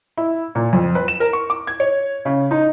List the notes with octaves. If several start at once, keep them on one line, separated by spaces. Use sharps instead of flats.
E4
A#2
F2
B4
E7
A#4
C#6
D6
G#6
C#5
C#3
D#4